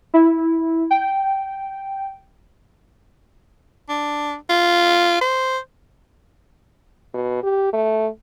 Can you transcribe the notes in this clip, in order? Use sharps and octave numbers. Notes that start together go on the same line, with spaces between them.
E4
G5
D4
F4
C5
B2
G4
A3